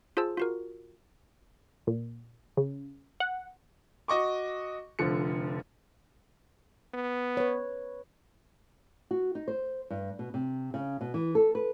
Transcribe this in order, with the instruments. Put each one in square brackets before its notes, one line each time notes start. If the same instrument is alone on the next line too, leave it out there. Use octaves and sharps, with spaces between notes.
[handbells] F4 G#4 C5 A5 E6
F4 F#4 A#4
[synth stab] A#2
C#3
F#5
[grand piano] F#4 D#5 C#6 D6
F1 D3 F3 C#7
[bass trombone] B3
[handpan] B4 C#5
[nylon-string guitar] F#4
D#4
C5
G2
B2
C3
C#3
B2
E3
A4
B4